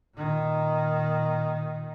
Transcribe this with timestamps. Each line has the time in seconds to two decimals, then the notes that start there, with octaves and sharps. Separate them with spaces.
0.14 A#2 D#3